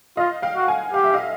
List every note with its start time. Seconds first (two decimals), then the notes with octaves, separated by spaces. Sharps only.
0.17 F4 D#5 F5
0.42 F5 G5
0.56 F#4
0.68 F#5 G#5
0.93 G4 F5
1.04 E5
1.14 D#5 F5